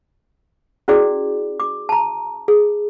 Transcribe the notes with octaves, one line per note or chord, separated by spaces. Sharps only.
C#4 E4 F#4 G#4 D5 D6
D6
A5 A#5
G#4